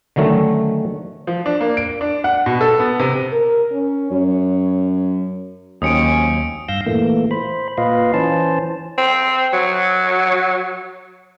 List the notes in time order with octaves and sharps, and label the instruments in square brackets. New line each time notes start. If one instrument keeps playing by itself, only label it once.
[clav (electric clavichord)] D3 D#3 F#3 A3 C#4
[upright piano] F3
D4
A#3
D7
D4
F#5
B2
A4
B3
C3
[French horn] A#4
C#4
[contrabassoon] F#2 [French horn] C#5
[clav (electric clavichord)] D#2 [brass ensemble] F#3 C4 C#4 [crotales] D#6 C#7 D7
[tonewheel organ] G2 F5 E6 G6 A#6
A#2 E3 A3 A#3
C5 B5
A#2 F4 B4 D#5 F5
E3 C#4 C5 A5
[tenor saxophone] C4
F#3